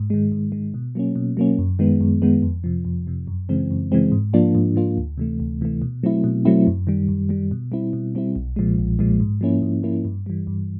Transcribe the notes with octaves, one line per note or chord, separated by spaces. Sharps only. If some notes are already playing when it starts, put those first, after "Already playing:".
Already playing: G#2
D#3 G#3
G#2
D#3 G#3
B2
F#3 A#3 C#4
B2
F#3 A#3 C#4
F#2
D#3 G#3 B3
F#2
D#3 G#3 B3
F2
C3 F3
F2
C3 F3
F#2
C#3 E3 G#3 C4
F#2
C#3 E3 G#3 C4
G#2
F3 A#3 D4 F4
G#2
F3 A#3 D4 F4
D2
C3 E3 A3
D2
C3 E3 A3
B2
F#3 A3 C4 E4
B2
F#3 A3 C4 E4
F#2
D#3 G3
F#2
D#3 G3
B2
G3 C4 E4
B2
G3 C4 E4
B1
A#2 F3 G#3
B1
A#2 F3 G#3
G#2
F3 A#3 C#4 E4
G#2
F3 A#3 C#4 E4
G2
E3 G3
G2